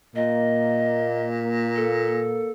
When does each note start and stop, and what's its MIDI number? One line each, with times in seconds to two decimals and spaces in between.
0.15 2.43 46
0.15 2.52 58
0.15 1.27 75
1.76 2.51 69